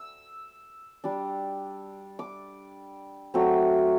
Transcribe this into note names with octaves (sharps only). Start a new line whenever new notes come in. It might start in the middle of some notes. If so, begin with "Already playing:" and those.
Already playing: E6
G3 D4
D6
F#3 A3 C4